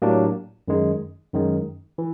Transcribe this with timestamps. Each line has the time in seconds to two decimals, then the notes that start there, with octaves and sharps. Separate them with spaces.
0.02 A2 F#3 A#3 D4 G4
0.68 F#2 D#3 G#3
1.33 F#2 D#3 G#3
1.98 E3